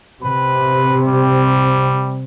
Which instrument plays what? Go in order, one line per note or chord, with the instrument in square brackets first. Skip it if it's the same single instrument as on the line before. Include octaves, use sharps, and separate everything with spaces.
[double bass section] C3 [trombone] B4
[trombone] G3